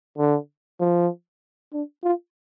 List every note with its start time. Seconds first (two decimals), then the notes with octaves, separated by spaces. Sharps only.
0.18 D3
0.80 F3
1.73 D4
2.04 F4